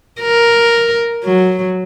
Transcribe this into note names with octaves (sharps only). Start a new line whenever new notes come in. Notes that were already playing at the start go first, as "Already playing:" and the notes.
A#4
F#3